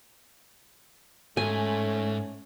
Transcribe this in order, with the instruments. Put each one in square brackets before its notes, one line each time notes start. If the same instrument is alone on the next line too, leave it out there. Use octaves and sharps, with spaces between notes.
[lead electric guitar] G#2 [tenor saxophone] A3 [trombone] C#4 [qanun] G#5